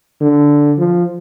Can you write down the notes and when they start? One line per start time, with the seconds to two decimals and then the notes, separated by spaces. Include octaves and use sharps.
0.21 D3
0.78 F3